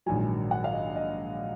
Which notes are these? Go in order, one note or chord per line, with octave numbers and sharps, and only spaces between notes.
A#1 G#2 D#3 F#3 G#5
F#5
F5
D#5
D#5